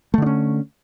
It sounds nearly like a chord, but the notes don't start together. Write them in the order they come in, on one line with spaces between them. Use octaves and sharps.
A3 D3 D4 C#4